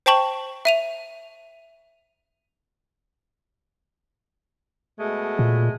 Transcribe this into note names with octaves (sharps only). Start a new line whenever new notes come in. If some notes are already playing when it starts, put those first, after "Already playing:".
C5 G5 A5 C#6 F#7
E5 D#7 F7
B2 G#3 A3
A#2